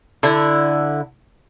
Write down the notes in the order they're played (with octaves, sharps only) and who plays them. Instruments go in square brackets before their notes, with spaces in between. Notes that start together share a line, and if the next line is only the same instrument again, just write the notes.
[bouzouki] D3 E4